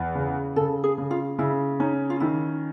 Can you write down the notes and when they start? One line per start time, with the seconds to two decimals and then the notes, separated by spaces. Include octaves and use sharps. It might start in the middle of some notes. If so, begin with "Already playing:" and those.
Already playing: E2
0.15 C#3
0.56 C#3 A4
0.84 G#4
0.98 C#3
1.11 F4
1.39 C#3 E4
1.80 C#4 D#4
2.10 F4
2.20 D#3 E4